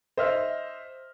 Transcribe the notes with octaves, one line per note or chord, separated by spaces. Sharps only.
C5 D#5 E5 F6